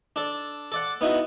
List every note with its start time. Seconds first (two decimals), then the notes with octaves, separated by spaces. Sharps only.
0.16 D4 A4
0.72 A4 D5 F#5
1.01 B3 D#4 E4 F#4